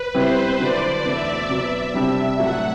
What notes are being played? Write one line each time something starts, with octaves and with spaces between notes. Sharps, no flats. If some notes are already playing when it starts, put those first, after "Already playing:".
Already playing: B4
B2 G3 C4 E4 C5
D3 F#3 B3 E4 D5
E2 B2 A3 D4 F#4 E5
B2 F#3 B3
C3 G3 D4
A2 F#3 A3 D4 F#4 F#5